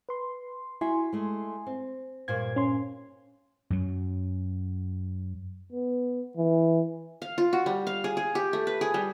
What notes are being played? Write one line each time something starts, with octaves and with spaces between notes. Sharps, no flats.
B4 C6
E4 F#4 E5 G#5 C6
G#3 A3
C4
G2 A#2 C5 G#6
C#4 C6
F#2 F#3
B3
E3
F5
F4
F#4
G3
F5
G#4
G#4
G4
A3
B4
G#4
G3